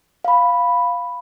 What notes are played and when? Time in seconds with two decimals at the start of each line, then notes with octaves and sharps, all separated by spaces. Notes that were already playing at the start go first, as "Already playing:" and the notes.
0.25 F5 B5